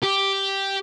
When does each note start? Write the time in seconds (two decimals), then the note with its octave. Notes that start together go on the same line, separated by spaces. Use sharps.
0.03 G4